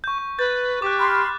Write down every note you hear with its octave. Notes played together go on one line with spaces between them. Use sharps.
C#6 G6
C#6
B4 G6 A6
G4 D6 F#6
B5 C6 F6